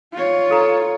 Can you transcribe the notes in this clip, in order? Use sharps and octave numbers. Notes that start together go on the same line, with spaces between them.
F4 C#5
A4 A#5